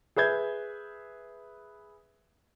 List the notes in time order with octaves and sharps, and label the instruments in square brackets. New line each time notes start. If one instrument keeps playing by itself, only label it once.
[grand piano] G#4 B4 E5 G6 G#6